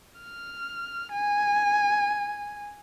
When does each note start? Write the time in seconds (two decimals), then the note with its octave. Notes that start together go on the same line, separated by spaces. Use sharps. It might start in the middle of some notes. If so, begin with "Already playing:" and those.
0.21 F6
1.12 G#5